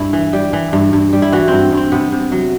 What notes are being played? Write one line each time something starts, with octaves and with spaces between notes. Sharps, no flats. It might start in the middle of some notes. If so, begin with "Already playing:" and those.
Already playing: G2 E4
E3
G3
E3
G2
G2
G3
E4
E3 F#4
G2 C4
G2
C4
C3 B3
C3
F#3